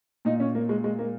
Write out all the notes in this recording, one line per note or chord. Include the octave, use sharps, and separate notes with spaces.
A#2 D#4
C#4
A#3
G#3
G#3
A#3